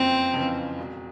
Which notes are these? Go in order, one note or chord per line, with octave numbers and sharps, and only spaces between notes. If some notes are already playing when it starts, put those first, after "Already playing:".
Already playing: F#1 F2 C#3 E3 C4
F2 C#3 E3
E1